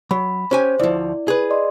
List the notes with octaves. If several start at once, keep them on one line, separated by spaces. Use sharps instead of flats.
F#3 B5
C#4 G4 C5 G#5
D2 F3 E4 D5
G#4 B4
D5 D#5 C6